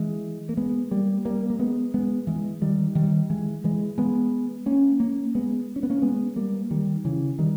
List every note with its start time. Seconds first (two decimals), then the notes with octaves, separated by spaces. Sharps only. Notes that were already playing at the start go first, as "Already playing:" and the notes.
Already playing: E3 G#3
0.49 A#3
0.57 G#3 B3
0.91 G3 A#3
1.25 G3 A#3
1.50 A#3
1.59 G#3 B3
1.94 G#3 B3
2.27 E3 G#3
2.62 D#3 G3
2.95 D#3 G3
3.30 E3 G#3
3.64 E3 G#3
3.98 G#3 B3
4.66 A#3 C#4
5.00 A#3 C#4
5.35 G#3 B3
5.76 C#4
5.83 B3
5.90 A#3 C#4
6.02 G#3 B3
6.36 G3 A#3
6.71 D#3 G3
7.05 C#3 E3
7.39 D#3 G3